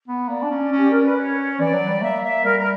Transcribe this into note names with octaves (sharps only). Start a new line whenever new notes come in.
B3
A#3 D5
D4
C#4
C#4
G4
C#4 A#4
B4
C#5
E3 D5
F#3
G3
A#3 E5
E5
G3 A#4
A#4